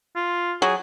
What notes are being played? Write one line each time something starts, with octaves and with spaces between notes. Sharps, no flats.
F4
F#3 G#4